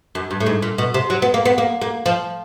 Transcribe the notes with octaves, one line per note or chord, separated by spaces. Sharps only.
F#2
G2
A2
G#2
A#2
B2
C3
F#3
B3
A#3
B3
A#3
A#3
F3